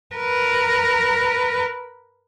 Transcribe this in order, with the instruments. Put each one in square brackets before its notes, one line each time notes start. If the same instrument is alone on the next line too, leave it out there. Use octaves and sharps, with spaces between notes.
[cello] A#4 B4